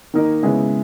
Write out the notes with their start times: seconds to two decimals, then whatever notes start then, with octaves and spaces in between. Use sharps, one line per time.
0.14 D#3 A#3 D#4 A#4
0.43 C#3 G#3 B3 E4 G#4